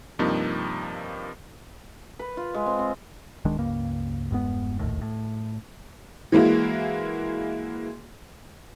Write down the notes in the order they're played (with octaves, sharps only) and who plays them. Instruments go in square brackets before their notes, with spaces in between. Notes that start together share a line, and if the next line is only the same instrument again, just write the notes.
[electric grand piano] G2 C3 F3 A#3 C4 D#4
[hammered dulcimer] B4
F4
G#3
C4
C4
[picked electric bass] D1 D#3 G#3 D4
C#2 G2 C#3 A#3
E1 G2 G#3 B3
F1 A#1 D#2 A2
A2
[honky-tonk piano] E3 G#3 A#3 E4 F#4